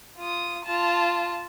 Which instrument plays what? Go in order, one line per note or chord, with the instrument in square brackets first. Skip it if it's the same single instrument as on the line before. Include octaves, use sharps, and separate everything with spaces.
[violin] F4 D#6
F4 A5